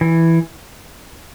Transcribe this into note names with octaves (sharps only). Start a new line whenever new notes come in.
E3